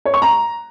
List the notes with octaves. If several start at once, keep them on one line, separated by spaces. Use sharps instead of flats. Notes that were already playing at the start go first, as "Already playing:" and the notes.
C#5
C#6
A#5